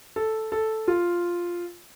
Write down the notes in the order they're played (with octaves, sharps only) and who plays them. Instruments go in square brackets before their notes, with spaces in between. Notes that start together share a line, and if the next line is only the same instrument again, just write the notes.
[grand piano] A4
A4
F4